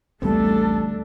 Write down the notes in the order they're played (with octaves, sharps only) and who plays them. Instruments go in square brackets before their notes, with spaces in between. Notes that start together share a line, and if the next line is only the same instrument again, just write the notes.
[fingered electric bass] A1 D2 [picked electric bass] G3 B3 C4 [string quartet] A3 D4 [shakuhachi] A4